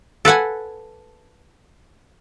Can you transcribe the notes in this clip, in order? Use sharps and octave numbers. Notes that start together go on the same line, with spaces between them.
A4 B4 F#5 G#5